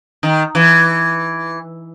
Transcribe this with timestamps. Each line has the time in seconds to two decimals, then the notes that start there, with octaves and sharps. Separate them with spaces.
0.23 D#3
0.55 E3